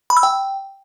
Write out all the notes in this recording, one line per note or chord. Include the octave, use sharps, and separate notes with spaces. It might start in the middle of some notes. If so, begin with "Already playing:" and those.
B5
E6
G5